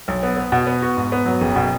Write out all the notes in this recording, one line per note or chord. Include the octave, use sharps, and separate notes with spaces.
B1
B3
B3
B2
B3
F#4
G#2
B3
F#3
F#1
B2